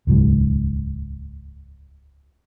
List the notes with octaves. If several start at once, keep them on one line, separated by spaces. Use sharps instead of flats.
D#1 C#2 G#2 F#3